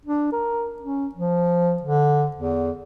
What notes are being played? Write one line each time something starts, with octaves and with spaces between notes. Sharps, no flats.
D4
A#4
C#4
F3
D3
E2